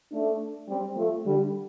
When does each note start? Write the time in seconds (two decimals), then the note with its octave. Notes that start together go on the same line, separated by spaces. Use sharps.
0.11 A3 D4
0.68 G3 C4
0.97 F3 A3
1.25 D3 G3